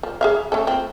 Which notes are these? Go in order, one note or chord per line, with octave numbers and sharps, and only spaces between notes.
F3
G#4 E5 F5
A3 C#4 A4
F3 C4